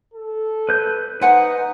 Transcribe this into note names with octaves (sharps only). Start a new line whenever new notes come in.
A4
B4 G6
D#4 B4 C5 F#5 G#5